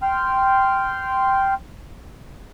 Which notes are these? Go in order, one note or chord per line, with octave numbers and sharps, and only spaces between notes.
G5 C6 F6